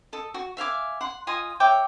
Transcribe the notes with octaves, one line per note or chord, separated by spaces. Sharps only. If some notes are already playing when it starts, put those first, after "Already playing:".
A4 D#5
F#4
E5 F5 G#5 D6
F#5 C6
F4 D#5 G#5 D#6
C#5 E5 G5 D6